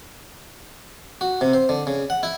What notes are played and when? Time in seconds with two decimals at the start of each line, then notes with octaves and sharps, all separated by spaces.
1.21 F#4
1.41 C3
1.53 C5
1.69 D3
1.87 C#3
2.10 F#5
2.23 E4